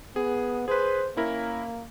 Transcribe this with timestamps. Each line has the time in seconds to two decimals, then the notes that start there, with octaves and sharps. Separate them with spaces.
0.16 B3 G#4
0.68 G#4 B4 C5
1.17 A#3 C#4 E4 A#4